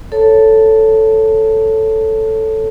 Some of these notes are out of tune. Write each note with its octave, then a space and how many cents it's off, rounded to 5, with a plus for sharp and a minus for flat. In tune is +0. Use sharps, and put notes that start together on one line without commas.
A4 +0 C#5 +0 A5 +10